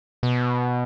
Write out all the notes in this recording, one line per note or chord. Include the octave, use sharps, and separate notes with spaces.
B2